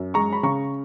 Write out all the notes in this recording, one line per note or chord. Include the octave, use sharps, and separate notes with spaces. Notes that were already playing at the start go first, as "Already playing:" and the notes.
Already playing: F#2
G#3 A#5 C#6
B5
C#3 A#5 C#6